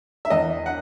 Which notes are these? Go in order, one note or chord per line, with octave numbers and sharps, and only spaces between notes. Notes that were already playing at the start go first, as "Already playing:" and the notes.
E5
E2 D#5
F#5